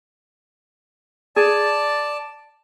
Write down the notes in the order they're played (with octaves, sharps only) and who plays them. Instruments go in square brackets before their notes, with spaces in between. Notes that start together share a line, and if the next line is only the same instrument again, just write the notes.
[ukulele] G#4 [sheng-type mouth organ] D5 A5